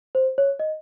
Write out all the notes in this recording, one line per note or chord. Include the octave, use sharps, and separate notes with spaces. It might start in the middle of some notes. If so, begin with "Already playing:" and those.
C5
C#5
D#5